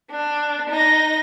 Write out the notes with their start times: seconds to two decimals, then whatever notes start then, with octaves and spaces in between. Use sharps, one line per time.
0.11 D4
0.70 D#4 A#6